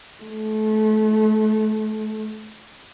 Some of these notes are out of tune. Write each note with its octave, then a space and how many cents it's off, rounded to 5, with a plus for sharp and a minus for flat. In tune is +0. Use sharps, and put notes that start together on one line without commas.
A3 -30